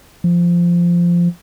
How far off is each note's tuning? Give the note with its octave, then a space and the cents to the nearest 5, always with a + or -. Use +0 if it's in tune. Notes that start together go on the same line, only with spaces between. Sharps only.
F3 -10